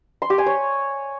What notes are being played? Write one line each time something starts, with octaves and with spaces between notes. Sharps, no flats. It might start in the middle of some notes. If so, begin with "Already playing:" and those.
C6
G4
G#5
C#5